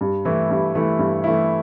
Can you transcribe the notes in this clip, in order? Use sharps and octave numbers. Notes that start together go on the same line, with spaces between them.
G2
E3 A3 E4
G2
E3 A3 E4
G2
E3 A3 E4